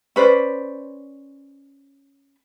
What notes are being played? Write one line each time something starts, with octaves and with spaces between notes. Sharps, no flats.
C#4 B4 C5 D5